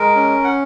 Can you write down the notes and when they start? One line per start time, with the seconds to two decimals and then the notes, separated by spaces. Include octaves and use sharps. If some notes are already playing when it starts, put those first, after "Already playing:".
Already playing: G#3 A#4
0.15 C#4
0.44 F#5